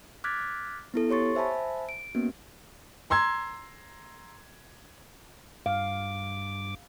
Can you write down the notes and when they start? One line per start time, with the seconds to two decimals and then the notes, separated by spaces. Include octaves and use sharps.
0.24 D6 F6 F#6 G#6 A6 B6
0.94 B3 E4 A4
1.10 G4 C#5 C6 C#6 A6
1.35 C5 E5 G#5 A5 B5
1.89 D7
2.15 A#3 B3 C#4 F#4
3.10 A#5 C6 E6 G#6
5.66 G2 F5 D6